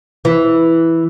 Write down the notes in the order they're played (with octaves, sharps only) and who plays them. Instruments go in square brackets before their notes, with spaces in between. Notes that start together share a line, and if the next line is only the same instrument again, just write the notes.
[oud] E3